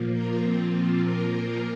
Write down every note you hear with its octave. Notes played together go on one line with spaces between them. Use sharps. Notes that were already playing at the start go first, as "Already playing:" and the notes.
Already playing: A#2 F3 A#3
F4 A#4
C4 F4
F4 A#4